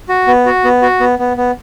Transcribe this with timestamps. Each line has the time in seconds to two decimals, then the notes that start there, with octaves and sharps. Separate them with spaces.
0.09 F#4
0.27 B3
0.46 F#4
0.64 B3
0.82 F#4
1.00 B3
1.19 B3
1.37 B3